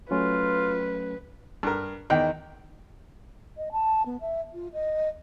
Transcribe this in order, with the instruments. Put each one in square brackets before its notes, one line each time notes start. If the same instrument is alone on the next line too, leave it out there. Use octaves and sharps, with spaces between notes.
[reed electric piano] F#3 A3 C#4 [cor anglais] F4 [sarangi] B4
[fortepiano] G2 A#4
[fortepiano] E2 G5 [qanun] D#3
[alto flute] D#5
A5
B3
E5
F4
D#5